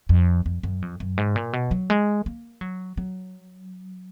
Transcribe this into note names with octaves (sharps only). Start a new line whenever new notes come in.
F2
F2
F#2
F2
F#2
G#2
A#2
B2
F#3
G#3
A#3
F#3
F#3